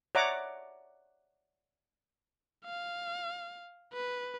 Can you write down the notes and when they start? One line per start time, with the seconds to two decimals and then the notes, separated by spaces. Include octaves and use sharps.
0.15 C#5 D5 E5 F#5 A#5 D6
2.65 F5
3.93 B4